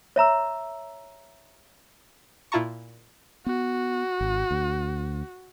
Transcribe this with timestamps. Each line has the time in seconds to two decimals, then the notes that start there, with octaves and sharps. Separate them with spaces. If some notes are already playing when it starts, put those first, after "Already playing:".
0.16 C#5 E5 A#5 E6
2.52 A#2 E4 F4 A5 A#5 C#6
3.46 B3 F#4
4.21 G#1
4.51 D2